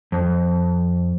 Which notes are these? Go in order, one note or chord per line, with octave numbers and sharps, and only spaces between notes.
F2